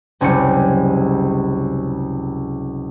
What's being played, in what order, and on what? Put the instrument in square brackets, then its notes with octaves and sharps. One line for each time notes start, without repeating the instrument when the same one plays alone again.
[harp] F#1 C#2 C3 G3 C#7